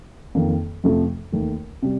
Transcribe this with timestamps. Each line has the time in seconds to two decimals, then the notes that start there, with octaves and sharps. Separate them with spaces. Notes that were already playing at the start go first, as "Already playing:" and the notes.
0.35 F2 D#3 A#3
0.84 F2 C3 F3 A3
1.32 D#2 D#3 A3
1.82 C3 G3